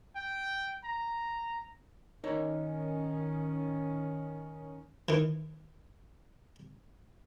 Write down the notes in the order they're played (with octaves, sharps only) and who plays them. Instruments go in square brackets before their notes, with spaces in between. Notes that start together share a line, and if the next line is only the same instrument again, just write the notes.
[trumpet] G5
A#5
[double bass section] D#3 C#4 [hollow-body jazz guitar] D#4 A#4 C#5
[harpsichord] D#3 E3